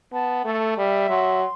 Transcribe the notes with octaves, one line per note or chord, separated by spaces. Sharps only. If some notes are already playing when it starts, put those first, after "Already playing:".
B3 A5
A3 A4
G3 E5
F#3 C6